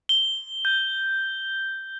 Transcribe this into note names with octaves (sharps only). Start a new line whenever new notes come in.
G7
G6